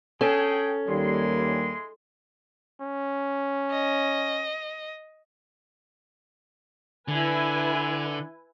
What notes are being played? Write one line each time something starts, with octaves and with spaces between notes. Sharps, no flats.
C#4 G#4 A4 G5
D#2 G3 G#3 A#3 E4 C6
C#4
D#5
D3 E4 B4 G#5